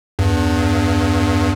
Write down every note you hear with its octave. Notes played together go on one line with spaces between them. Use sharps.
E2 G2